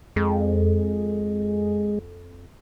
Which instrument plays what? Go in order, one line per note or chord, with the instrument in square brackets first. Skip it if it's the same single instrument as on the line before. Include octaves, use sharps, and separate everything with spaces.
[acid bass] F2 [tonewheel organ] G#3